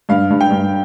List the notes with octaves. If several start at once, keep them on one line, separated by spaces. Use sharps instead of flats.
G2 F5
G2
G5
G2